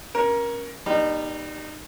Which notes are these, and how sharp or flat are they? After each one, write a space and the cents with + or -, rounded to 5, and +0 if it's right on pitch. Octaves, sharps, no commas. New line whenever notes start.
C#4 -5 A#4 +20
G3 +0 A#3 +35 D#4 -25